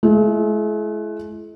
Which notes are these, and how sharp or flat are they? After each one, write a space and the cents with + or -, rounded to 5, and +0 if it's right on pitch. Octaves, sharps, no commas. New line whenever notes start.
G#3 +45 E4 +30